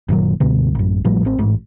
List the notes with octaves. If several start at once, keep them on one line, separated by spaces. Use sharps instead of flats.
F#1 A#2 D#3 F#3
C#2 G2 B2 D3
A1 F#2
A1 A2 F3 G3
A1 C4
A1 G#2